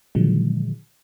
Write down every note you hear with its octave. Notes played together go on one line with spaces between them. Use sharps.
A#2 D3 D#3 F3 F#3 G#3